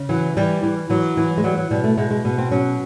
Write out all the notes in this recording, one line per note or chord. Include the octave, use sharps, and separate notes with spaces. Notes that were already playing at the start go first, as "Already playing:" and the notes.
Already playing: C#3
E3 F#3
E3 G3
E3
E3 F#3
E3
G#3
F#3 G3
F#3
B2 G3
A3
B2 G#3
G#3
B2 B3
C4
F#3 C#4